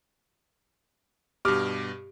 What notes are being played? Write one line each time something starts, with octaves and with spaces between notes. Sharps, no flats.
G2 B2 G4 D6 F6